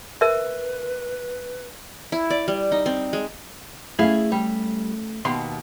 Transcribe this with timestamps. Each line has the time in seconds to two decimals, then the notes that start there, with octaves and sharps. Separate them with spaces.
0.21 A#4 B4 E5
2.12 E4
2.30 D5
2.48 G3
2.72 D#4
2.86 C4
3.13 G#3
3.99 A3 C#4 E4 G#4 F5
4.32 G3
5.25 D#2 B2 C6